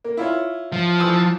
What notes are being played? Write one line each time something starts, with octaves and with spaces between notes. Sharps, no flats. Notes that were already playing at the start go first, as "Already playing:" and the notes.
A#3
E4 F4 C#5
F3
E3 D#6 E6